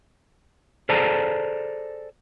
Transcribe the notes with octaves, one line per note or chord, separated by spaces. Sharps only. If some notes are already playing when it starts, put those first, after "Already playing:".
G#4 A4 C5 D5 A5 A#5